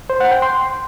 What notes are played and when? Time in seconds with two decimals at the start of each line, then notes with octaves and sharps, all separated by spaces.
0.10 C5
0.20 F#5
0.31 G5
0.42 C6